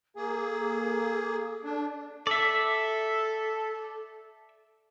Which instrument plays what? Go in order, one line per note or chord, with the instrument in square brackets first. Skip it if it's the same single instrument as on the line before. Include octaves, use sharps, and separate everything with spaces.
[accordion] A#3 G#4 [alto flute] G#5
[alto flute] A4
[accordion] D4
[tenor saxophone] A4 [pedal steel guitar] D5 E5